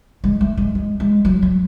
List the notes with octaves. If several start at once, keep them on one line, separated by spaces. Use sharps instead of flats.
G#3
A3
G#3
G#3
G#3
F#3
F#3